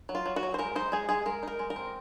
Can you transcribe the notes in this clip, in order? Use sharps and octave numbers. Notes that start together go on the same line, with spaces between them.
F#3
F4
F#3
F#4
F#3
C5
G#3 A#4
D#4 C5
G#3 G#4
G#3 G#4
G#3 A#4
D#4 A#4
G#3
A#4
C4